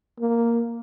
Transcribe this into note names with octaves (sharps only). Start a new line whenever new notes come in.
A#3